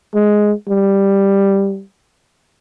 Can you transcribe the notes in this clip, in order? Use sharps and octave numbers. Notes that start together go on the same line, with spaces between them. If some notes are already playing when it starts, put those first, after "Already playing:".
G#3
G3